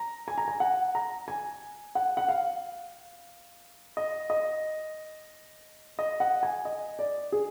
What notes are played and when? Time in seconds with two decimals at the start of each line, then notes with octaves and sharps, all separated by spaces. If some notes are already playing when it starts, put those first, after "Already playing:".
Already playing: A#5
0.28 G#5
0.38 A#5
0.48 G#5
0.60 F#5
0.95 A#5
1.28 G#5
1.95 F#5
2.17 F#5
2.28 F5
3.97 D#5
4.30 D#5
5.99 D#5
6.20 F#5
6.43 G#5
6.65 D#5
6.99 D5
7.32 G#4